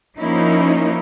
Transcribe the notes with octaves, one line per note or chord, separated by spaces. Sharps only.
F3 A#3 C#4 D#4 E4